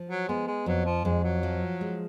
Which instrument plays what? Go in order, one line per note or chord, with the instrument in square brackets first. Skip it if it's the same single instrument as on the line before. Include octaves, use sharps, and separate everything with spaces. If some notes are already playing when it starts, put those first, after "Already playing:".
Already playing: [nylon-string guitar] F3
[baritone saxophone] F#3
[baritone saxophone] G#3 [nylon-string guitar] B3
[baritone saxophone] G#3
[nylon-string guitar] F2 [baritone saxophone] F#3
[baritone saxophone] F3
[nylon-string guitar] F2 [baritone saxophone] G#3
[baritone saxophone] F#3
[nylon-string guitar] F3
G#3